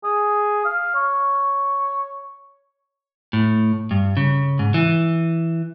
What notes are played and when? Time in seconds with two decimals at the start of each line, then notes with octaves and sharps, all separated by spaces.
0.04 G#4
0.65 F5
0.95 C#5
3.33 A2
3.91 G2
4.17 C#3
4.59 G#2
4.74 E3